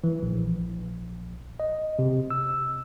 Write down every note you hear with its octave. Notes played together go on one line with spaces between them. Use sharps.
E3
A#1
D#5
C3
E6